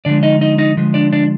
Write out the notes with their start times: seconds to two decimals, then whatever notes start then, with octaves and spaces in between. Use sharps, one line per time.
0.05 D3 F3 G#3 D4 D5
0.23 D#4 D#5
0.41 D#4 D#5
0.58 D#4 D#5
0.77 D3 F3 G#3
0.94 D4 D5
1.13 D4 D5